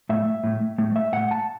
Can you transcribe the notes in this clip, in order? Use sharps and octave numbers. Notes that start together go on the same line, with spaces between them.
A2 A3 E5
A2 A3
A2 A3
E5
A2 A3 F#5
A5